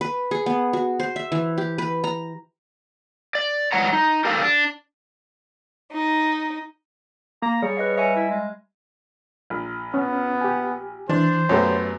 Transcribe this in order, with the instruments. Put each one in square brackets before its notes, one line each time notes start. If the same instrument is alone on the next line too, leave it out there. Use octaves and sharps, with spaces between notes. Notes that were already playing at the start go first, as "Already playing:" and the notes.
[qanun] B4
G#4
B3
F#4
C5
E5
E3
G4
B4
A#5
[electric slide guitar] D5
G#2 E3 G3 C#5 F#5 A#5
D#4
G4 A4 A#4 F5
D4
[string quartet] D#4
[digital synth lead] A#3 [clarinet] A#5
[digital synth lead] G3 [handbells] G#4 [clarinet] C#5
[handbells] B4 D#5 F5
[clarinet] C#5 [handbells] D#5 E5 G#5
[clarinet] E4
G#3
[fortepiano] A#1
[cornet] B3 [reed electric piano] C#4
[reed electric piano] G4 G#5
[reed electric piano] E3 [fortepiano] D4 [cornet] C5
[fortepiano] F#2 A3 B3 [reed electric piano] G4 C#5